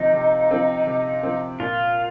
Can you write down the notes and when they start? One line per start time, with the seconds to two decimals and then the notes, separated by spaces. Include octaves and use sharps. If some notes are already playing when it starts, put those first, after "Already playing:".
Already playing: C3 F3 C4 D#4
0.13 C3
0.51 F3 C4
0.87 C3
1.23 F3 C4
1.60 A#2 F4